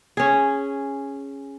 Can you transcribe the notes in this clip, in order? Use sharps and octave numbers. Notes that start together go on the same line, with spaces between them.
C#4 G#4